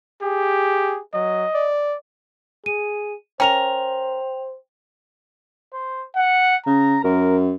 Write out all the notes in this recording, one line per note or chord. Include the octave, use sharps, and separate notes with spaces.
G4 G#4
F#3 D#5
D5
G#4 D#7
C#4 A#4 C5 G5 F7
C5
F#5
C#3 A#5
F#2 A#4